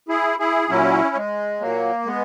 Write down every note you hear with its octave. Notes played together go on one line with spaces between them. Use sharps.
E4 G#4
E4 G#4
A#2 F#3 C#4 E4
G#3
A#2 F#3 A#3
G#3 B3